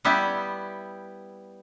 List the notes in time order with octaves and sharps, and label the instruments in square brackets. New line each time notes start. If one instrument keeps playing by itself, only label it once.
[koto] G3 B3 E4 G4